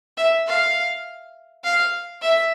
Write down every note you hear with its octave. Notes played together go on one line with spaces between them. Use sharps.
E5
F5
F5
E5